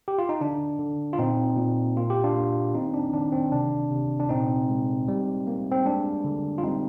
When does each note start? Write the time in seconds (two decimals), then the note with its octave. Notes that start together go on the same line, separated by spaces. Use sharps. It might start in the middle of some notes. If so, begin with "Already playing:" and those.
0.08 G4
0.18 F4
0.29 D#4
0.41 D3 D4
0.79 D3
1.13 F4
1.18 A#2 C4 D#4
1.57 A#2
1.97 A#3 F4
2.10 G4
2.24 D4 F4
2.36 A#3
2.74 D#3 C4 D#4
2.94 D4
3.13 D#3 D4
3.32 C4
3.52 C3 D4
3.91 C3
4.20 D4
4.29 A#2 C4 D#4
4.69 G#3
5.08 G3
5.47 A#3
5.72 C4
5.85 G#3 D4
6.24 D3
6.58 F4
6.63 G3 C4 D#4